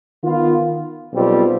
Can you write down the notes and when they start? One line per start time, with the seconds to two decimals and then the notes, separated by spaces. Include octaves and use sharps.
0.23 D#3 B3 F4
1.13 B1 B2 G3 C4 F4